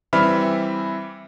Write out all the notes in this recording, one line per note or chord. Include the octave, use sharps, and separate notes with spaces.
E3 G3 C4 E5 B5 F6